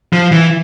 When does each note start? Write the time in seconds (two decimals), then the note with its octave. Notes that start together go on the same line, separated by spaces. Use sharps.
0.13 F3
0.32 E3